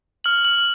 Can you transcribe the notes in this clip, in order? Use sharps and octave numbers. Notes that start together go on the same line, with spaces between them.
F6 F#7
F6 F#7